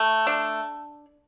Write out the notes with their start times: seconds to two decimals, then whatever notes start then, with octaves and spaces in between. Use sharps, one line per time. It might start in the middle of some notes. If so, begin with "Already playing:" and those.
Already playing: A3
0.27 D4